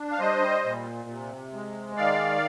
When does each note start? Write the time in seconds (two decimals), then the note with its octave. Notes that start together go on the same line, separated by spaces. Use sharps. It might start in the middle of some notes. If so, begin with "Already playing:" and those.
Already playing: D4
0.12 F5
0.20 G3 C5 D#5
0.64 A#2
1.09 C3
1.53 G#3
1.97 D#3 D5 F5